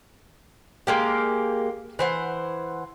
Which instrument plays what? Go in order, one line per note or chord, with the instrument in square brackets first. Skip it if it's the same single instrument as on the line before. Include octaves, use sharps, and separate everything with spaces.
[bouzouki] G#3 A#3 G4
E3 C5 F#5